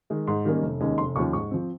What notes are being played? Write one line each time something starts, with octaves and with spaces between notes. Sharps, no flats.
D#3 G#3
G#2 C6
D#3 G3 A#3 C#4
F1
D#2 D#3 G#3 C#4
F1 C6
D#2 C#3 F3 C#6
G#2 C#6
F3 C4